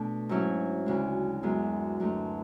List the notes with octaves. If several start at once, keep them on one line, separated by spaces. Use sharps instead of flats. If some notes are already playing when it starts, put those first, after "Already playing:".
Already playing: B2 A3 D4
G#2 F#3 C#4 E4
D2 C#3 G#3
F#2 D3 G#3 B3
F#2 D3 A3